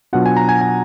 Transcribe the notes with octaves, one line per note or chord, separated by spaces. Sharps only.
B2 F#3 D4 F4 F#5
G#5
A#5
G#5
G#5